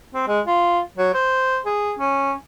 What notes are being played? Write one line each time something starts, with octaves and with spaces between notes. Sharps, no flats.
C4
G#3
F4
F#3
C5
G#4
C#4